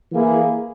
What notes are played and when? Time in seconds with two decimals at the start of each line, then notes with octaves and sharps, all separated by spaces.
0.11 E3 A#3 E4 G#4